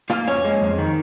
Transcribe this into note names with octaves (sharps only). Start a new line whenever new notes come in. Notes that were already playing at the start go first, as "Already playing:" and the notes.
A#3 F4 F5
F2 C#4 C#5
G#3
F2
D#3